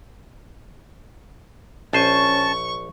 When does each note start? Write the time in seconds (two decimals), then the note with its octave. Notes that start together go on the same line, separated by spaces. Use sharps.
1.93 A#1 C#4 C5 G#5 A5 C#6